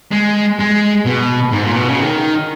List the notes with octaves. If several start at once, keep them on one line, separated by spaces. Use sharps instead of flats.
G#3
G#3
B2
G#2
A#2
B2
C#3
D#3